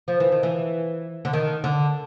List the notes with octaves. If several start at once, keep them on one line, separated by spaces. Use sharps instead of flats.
F3
E3
D#3
E3
D3
D#3
D3